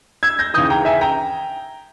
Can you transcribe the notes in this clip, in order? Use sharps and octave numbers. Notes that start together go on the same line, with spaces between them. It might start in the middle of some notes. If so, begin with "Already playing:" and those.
E6 G#6
G6 A#6
D#2 C#3 E3 D#6 G6
G5 A#5
E5 G#5
G5 A#5